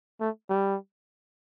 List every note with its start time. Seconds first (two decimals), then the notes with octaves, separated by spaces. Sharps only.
0.21 A3
0.50 G3